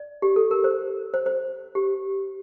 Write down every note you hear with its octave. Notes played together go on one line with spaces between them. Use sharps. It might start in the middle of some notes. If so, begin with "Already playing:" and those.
Already playing: D5
G4
A4
A#4
C5
C5
C5
G4